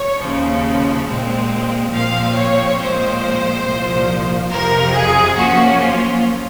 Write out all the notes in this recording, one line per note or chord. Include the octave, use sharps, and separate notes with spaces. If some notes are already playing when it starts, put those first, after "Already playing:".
Already playing: C#5
D#2 C#3 F3
A#2 G#3 C4
A#2 F3 C4 F5
C#5
A#2 F3 G#3 C4 C5
C2 A#2 F3
F2 C3 F3 A#4
G#4
F#2 F3 A#3 C#4 F#4
F4